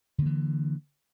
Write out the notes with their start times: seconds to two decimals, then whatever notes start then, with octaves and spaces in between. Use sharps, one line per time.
0.18 D3
0.22 A#3
0.26 E3